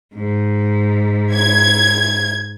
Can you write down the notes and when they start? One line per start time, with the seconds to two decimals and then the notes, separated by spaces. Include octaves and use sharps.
0.14 G#2
1.34 G#6